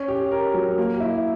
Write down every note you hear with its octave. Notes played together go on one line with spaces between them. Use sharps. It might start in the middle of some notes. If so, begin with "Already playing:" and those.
Already playing: C#4
G4
A#4
F#3
A#3
E4